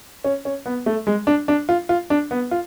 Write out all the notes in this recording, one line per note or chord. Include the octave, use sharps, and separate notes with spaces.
C#4
C#4
B3
A3
G#3
D4
D4
F4
F4
D4
B3
F4